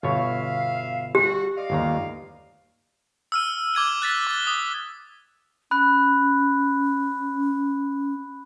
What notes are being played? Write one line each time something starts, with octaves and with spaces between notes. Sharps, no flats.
G1 B2 C#5 E5 F5
G3 F#4 G4
D5 D#5 F5
G1 D#2 A#5
E6 F6 D#7
D6 G#6 D#7 G7
F#6 A6 B6
D6 A6 G7
D#6
C#4 B5 F#6